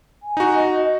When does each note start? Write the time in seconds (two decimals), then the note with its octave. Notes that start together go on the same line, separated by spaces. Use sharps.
0.23 G#5
0.37 D#4 F#4
0.56 D#5